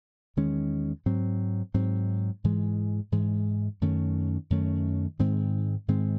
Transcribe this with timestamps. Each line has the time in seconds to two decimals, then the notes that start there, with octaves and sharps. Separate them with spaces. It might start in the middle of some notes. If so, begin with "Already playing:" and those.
0.37 E2 D#3 G#3 C#4
1.06 G#2 F#3 C4
1.74 G#2 F#3 C4
2.44 G#2 E3 G#3
3.12 G#2 E3 G#3
3.81 F#2 D#3 A3 C#4
4.50 F#2 D#3 A3 C#4
5.19 G#2 D#3 G#3 C4
5.88 G#2 D#3 G#3 C4